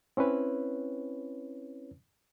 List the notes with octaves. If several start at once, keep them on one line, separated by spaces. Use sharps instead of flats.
C4 C#4 E4 B4 C#5